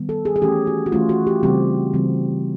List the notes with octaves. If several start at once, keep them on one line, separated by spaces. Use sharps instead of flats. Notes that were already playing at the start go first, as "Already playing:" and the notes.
Already playing: D#3 G3 B3
A4
G#4
G#4
E3 A3 C#4 G4
F#4
F#4
E3 A3 C#4 F4
F#4
G4
C#3 E3 G3 C4 G4
C#3 E3 G3 C4